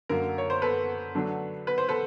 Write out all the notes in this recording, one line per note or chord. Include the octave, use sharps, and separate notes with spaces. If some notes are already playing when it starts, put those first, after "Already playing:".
F#2 D3 F#3 A#3 A#4
C#5
C5
A4 B4
D3 F#3 A3 D4
B4
C5
A4 B4